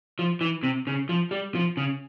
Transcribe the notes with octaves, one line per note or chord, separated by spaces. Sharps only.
F3
E3
C3
C#3
F3
G3
F3
C#3